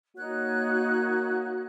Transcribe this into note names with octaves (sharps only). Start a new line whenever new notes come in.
A#3 D#4 F#4 C#5 F#6